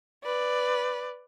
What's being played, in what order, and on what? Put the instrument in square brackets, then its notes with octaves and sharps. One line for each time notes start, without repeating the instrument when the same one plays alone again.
[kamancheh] B4 D5